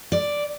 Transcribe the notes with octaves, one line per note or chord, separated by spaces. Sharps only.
D5